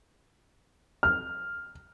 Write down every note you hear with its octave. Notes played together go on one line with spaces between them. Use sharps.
F6